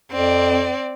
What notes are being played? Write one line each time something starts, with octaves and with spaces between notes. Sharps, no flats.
F2 C4 D5